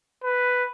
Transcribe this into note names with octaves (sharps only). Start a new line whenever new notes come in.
B4